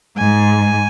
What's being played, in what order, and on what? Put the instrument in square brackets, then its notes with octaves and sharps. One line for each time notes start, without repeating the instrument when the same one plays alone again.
[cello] G#2 [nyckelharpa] G#5